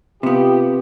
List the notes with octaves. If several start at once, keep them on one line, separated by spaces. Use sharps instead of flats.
C3 B3 F4 G4